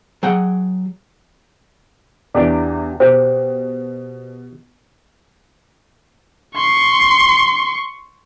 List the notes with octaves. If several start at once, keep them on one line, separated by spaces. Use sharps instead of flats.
F#3 G#4 F#5 G5
E2 E3 D4 G4 D5
B2 G4 C5
C6 C#6